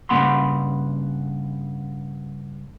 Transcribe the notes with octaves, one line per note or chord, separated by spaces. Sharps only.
G2 C#3 A#3 F#5 B5 C6